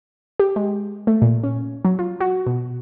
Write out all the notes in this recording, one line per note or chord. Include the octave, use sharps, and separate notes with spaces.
G4
G#3
A3
A#2
C#4
F#3
F4
F#4
B2